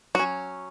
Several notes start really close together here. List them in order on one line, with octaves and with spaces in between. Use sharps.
F#3 F#4 C#4